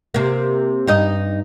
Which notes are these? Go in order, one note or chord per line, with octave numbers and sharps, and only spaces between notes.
C3 A#3
G2 D#4 D#5